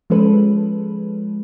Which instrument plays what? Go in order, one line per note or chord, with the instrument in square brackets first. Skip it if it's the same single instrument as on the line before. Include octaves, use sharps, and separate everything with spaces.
[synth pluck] F3 G#3 C#4 A4 B4